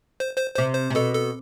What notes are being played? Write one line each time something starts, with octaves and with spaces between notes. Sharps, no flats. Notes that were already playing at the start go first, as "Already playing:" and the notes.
C5
C5
C3 C5
C5
C3
B2 A4
A4